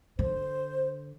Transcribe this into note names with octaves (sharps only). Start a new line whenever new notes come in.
D3 C5